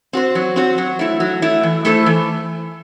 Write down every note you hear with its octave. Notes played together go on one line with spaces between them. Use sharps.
C4 F#4 C5
F#3
C4 F#4 C5
F#3
A3 E4
F#3
A3 E4
E3
A3 E4 A4 C5
E3